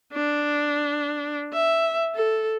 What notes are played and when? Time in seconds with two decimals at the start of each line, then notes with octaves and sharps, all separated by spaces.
0.13 D4
1.53 E5
2.15 A4